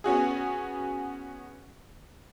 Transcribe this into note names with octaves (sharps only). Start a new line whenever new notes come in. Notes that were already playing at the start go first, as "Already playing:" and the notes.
B3 C#4 F#4 G#4